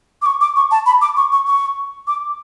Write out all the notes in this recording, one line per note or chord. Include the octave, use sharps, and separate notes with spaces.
D6
C#6
D6
C#6
A5
B5
D6
C#6
C#6
C#6
D6